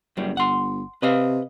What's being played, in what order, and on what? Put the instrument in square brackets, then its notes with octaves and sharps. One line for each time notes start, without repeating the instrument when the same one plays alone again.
[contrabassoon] F#1 [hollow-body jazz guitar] F#2 G3
[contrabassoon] G1 [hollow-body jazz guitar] F#5 C6
[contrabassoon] C3 [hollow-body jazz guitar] B4 D#5 F5